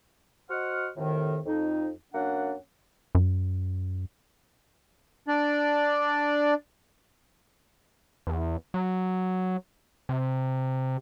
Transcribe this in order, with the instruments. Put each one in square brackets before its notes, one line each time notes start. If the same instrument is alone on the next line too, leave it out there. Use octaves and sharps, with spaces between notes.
[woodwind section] F#4 C5 D#5 F#5 F6
F2 A2 C3 D#3
F2 D#4
F#2 A#3 C#4 D4 F#5
[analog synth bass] F#2
[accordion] D4 D5
[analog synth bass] E2
F#3
C3